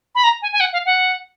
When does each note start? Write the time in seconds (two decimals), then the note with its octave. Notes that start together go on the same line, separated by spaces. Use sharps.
0.15 B5
0.24 A#5
0.42 G#5
0.53 G#5
0.60 F#5
0.73 F5
0.86 F#5